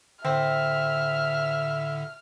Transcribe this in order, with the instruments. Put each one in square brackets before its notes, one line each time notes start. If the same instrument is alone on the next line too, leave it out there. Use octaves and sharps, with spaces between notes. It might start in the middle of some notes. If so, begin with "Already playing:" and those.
[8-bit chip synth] A2 D3 [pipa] C4 [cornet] E5 [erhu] F6